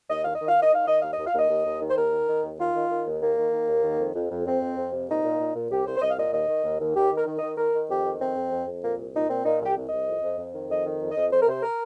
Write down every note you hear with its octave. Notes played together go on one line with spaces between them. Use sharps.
D#2 D#5
D#3 F5
D#5
D#3
F5
D#3 D#5
D#3 F5
D#3 D#5
D#2 F5
D#5
D#2
F5
D#2 D#5
D#2
D#2
D#3
C5
D#2 A#4
D#3
D#3
D#2
D#3 F4
D#3
D#3
D#2
D#3 A#3
D#3
D#3
D#2
D#3
F2
F2
F2
F2 C4
F2
F2
C3
A#2 D#4
A#2
A#2
A#2
C2 G4
C2 C5
C5
C2 D#5
F5
A#2 D#5
D#2 D#5
D#3
D#2
D#2
D#2 G4
D#3 A#4
D#3
D#5
D#3
D#3 A#4
D#3
F2 G4
D#3
F2 C4
F2
F2
F2
A#2 A#3
C2
A#2 D#4
A#2 C4
A#2 D#4
C2
G4
C2
D#5
C2
F2
F2
F2
D#3
F2 D#5
D#3
F2
F2 D#5
F2 C5
A#4
C3 C5
A#4